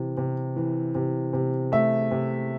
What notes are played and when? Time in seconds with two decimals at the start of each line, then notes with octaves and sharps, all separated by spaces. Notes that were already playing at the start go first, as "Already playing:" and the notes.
Already playing: C3 E3
0.17 C3
0.56 E3
0.95 C3
1.33 C3
1.72 A3 E5
2.11 C3